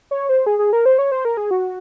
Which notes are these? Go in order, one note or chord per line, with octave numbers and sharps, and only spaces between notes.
C#5
C5
G#4
G#4
A#4
C5
C#5
C5
A#4
G#4
F#4